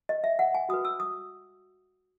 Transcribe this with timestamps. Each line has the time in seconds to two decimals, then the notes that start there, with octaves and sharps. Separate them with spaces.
0.09 D#5
0.24 E5
0.39 F#5
0.54 G#5
0.69 F#4 B4 D#6
0.85 E6
1.00 D#6